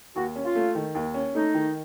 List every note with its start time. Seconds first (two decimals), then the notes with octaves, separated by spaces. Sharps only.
0.16 D#2 F#4
0.36 C#4
0.45 F4
0.55 A3
0.75 D#3
0.95 D#2
1.14 C#4
1.35 A3 D#4
1.54 D#3